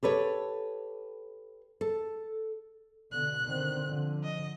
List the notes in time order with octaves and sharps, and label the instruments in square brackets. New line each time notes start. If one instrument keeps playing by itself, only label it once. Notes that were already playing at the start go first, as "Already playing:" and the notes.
[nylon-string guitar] G4 A4 B4 C#5
A4
[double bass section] B2 D3 [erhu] F#6
[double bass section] D3 D#3 C4
D3 F3
[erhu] D#5